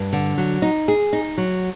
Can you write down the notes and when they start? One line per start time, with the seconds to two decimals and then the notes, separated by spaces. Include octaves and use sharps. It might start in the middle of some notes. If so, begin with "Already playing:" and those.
Already playing: G2
0.13 D3
0.38 F#3
0.62 D#4
0.88 G#4
1.13 D#4
1.38 F#3